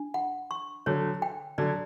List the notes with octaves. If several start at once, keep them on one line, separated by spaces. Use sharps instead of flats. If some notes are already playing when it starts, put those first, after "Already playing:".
Already playing: D4
F#5
C#6
D3 F#3 C#5
G5
D3 F#3 D5